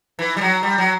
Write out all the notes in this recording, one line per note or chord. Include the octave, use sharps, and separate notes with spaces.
E3
G3
F#3
G3
F#3